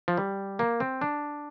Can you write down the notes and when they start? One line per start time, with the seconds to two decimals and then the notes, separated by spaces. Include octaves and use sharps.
0.08 F3
0.17 G3
0.59 A#3
0.80 C4
1.01 D4